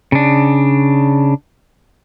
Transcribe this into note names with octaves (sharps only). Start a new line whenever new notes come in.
C#3 D4